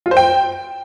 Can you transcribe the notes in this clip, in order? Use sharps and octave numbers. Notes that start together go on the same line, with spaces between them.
F4
C5
G5